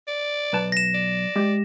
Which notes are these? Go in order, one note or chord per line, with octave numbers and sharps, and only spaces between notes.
D5
B1 B4 A5
A#6 E7
D5
G#3 G4